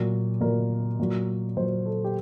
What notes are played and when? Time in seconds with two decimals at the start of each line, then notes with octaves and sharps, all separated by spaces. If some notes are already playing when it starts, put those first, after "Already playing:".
Already playing: A#2 F#3
0.41 A#2 F#3 A#4
0.99 A#2 F#3
1.57 A#2 F#3 C5
1.86 A4
2.04 G4